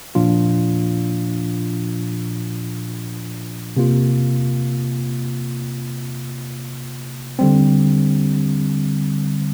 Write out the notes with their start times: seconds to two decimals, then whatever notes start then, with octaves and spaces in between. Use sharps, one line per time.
0.15 A#2 F3 D4 F4
3.77 C3 A#3 F4
7.39 D3 G3 C4